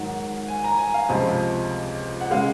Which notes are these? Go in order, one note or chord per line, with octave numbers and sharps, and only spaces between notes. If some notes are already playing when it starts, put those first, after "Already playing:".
Already playing: G#2 D#3 F#3 F#5
G#5
A#5
G#5
F5
C#2 C3 F3 C4 D#5
F#5
C#3 G#3 F5